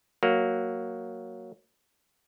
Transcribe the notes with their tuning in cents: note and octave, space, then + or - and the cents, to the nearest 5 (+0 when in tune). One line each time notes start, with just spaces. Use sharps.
F#3 +0 A#3 +0